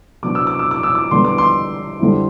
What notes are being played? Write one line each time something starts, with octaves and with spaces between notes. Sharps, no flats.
C3 F#3 B3 D4 D6
E6
D6
E6
D6
E6
D6
D3 G3 B3 C6
D6
C6
D3 G3 C4 E4